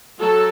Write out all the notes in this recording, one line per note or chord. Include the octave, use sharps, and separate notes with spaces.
F#3 A4